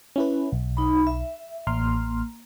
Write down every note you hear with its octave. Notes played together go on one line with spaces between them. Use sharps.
C#4 E4 B4
B1
D#4 B5
E5
A1 A#3 C6 F6